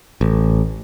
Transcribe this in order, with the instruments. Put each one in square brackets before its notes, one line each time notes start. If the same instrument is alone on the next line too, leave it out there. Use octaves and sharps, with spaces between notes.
[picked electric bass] A1